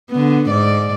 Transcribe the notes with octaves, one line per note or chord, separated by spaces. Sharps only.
D3 B3
G#2 D5